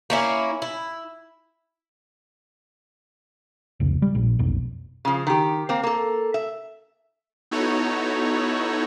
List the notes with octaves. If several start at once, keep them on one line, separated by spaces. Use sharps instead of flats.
A#3 C#4 E4
E4
F1 C#2
G3
A#1
F1 B1
C#3 F3
D#3 G4
A#3 C4
A#3 A4
E5
B3 D#4 E4 F#4 A4 C#5